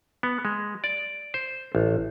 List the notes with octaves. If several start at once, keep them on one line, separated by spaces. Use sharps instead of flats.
B3
G#3
D5
C5
A1